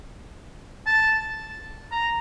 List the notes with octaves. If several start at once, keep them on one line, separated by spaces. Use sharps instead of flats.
A5
A#5